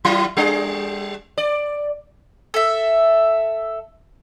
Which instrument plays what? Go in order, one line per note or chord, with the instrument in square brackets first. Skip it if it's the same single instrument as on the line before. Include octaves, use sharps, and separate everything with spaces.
[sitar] F#3 E4 F4
G3 D4 G#4
D5
[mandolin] A4 E5